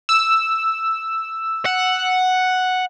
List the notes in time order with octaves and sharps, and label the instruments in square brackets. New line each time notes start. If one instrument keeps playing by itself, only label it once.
[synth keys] E6
[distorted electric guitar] F#5